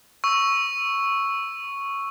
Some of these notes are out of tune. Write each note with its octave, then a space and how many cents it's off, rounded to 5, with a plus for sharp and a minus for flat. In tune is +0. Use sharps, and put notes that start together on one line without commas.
C#6 +0 E6 +0